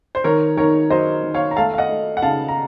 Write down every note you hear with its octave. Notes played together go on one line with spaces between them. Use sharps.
C5
D#3 A#4 C#5
D#3 A#4 C#5
F#3 C5 D#5
D#3
C#5 F5
A#5
A3 F5 A5
F5
D#5 F#5
A3
F#5
C#3 F5 A5
A#5